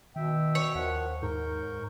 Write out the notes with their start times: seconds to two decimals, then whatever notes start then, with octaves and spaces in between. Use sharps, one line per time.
0.16 B2 D#3 E5 G5
0.55 C#5
0.75 D#2 D#3 F3 F#5
1.22 G#2 A#4 C#6 G6